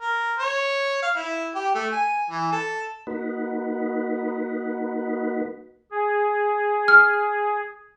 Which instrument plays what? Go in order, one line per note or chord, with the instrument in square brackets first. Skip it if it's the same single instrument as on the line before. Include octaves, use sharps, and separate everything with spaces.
[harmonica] A#4
C#5
F5
E4
G4
A3
G#5
E3
A4
[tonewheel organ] A#3 D#4 F#4 B4
[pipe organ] G#4
[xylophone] F6